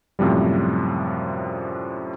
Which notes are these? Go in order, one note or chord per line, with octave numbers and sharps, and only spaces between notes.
F#2 A2 C3 F3 G3